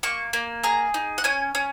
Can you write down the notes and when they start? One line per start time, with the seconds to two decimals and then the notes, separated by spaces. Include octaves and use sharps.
0.03 A#3 C#6
0.33 A#3
0.63 G#4 A#5
0.94 D#4
1.18 F#5
1.24 C#4 G#5
1.55 C#4